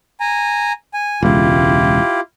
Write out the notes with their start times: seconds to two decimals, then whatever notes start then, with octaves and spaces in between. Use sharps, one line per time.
0.20 G#5 A#5
0.94 G#5
1.23 E1 C#2 E4 F4 G4